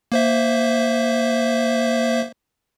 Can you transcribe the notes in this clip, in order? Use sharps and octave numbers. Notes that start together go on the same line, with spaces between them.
A#3 C5 E5